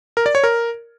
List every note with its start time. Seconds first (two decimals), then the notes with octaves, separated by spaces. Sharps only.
0.17 A#4
0.26 D5
0.35 C#5
0.44 A#4